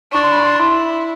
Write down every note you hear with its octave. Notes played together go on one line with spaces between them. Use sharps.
D4 C#6
C6
B5
C6
E4